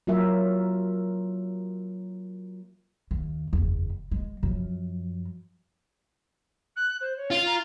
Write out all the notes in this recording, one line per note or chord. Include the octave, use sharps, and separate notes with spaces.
F#3 A#3 F4 A#4 E5
D#2
F#1 E2
G#3
F#2 F3
F#6
C5
C#5
F4
A#5